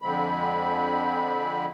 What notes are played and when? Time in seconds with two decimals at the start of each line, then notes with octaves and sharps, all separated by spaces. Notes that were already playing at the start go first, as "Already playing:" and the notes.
0.02 F2 D3 F3 G#3 C4 B5